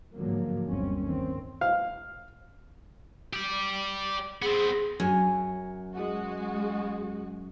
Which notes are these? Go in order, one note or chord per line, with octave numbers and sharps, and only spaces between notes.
G#2 D3 F3 F#3 A#3
G1 D#2 C4 C#4
D#3 C4
F5
G4 D5
B3 C4 G#4
F#2 C#5 G#5
G#3 F#4